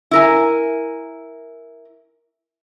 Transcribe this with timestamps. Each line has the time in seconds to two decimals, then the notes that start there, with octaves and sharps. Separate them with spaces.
0.11 E4 A#4 G#5